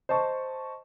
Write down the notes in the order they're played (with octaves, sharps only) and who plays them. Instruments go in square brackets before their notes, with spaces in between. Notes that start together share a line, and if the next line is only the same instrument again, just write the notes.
[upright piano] C5 D#5 A5 C#6